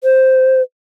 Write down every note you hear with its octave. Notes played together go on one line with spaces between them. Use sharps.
C5